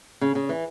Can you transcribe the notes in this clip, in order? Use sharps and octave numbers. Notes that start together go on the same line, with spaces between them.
C#3
C#3
E3